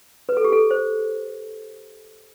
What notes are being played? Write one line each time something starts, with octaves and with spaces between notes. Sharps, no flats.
B4
A4
G4
A4
C5